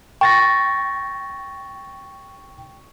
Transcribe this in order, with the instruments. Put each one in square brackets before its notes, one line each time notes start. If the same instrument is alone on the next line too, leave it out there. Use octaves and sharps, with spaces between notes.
[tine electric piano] G5 [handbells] C#6 A6 A#6